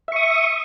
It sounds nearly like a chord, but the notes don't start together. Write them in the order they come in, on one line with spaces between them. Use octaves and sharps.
E5 C#6 D#6